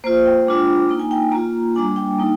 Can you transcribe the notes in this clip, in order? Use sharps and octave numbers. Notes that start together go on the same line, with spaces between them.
A#3 F4 C5
G5
G#3 D4 F4
A#3 D#4 A#5
G#5
G5
A#3 F4 A#5
G3 A#3 D4 G#5
G5
A#3 D#4